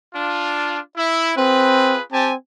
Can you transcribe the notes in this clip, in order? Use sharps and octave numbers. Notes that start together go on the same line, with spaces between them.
D4 F4
E4
C4 F4 G#4 B4
C4 G4 G#5 A5